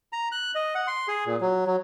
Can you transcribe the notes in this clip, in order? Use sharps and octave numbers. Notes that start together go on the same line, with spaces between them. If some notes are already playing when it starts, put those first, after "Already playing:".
A#5
F#6
D#5
F#5
C6
G#4
A#2
F#3
F#3